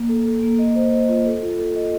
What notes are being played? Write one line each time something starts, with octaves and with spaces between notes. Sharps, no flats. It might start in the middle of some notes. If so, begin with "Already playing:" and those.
Already playing: A#3
A4
A4
A#3
D#5
C5
D#5
F4
A4
F4
A4
D#5